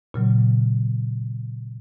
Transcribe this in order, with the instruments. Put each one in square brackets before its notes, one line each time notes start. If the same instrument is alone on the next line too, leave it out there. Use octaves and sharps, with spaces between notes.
[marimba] A#2 C#3 F#3